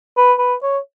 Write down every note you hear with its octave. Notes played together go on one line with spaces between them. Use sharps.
B4
B4
C#5